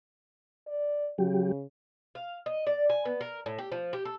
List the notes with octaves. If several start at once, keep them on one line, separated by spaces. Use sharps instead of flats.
D5
C#3 F#3 G4
F5
D#5
D5
G#5
B3
A#4
A2
G4
F3
G4
A4